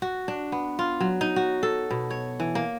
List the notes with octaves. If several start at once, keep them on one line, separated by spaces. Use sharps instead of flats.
F#4
D4
B3
F4
F#3
D#4
F#4
A4
B2
C#5
E3
A#3